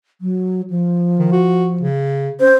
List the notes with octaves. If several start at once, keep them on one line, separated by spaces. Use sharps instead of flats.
F#3
F3
D#3
F#4
C#3
C#4 C5